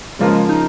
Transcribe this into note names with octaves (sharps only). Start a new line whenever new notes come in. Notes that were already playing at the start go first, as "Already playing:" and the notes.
C#3 F3 G#3 A#3 F4 A#4
D#4